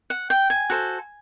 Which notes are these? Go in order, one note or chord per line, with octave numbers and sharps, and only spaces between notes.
F#5
G5
G#5
F#4 A4 C5